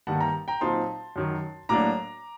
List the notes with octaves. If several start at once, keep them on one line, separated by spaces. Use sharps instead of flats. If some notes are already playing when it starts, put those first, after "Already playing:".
G2 D#3 G3 A#3 F#5 A5
G5 A#5
G5 A#5
A#2 F#3 C4 D#4 A5 C6
F#2 D#3 F#3
A2 F#3 A#3 D4 A#5 D6